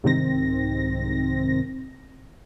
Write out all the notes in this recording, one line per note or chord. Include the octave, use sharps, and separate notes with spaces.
C2 G#2 C3 D#3 C4 A#6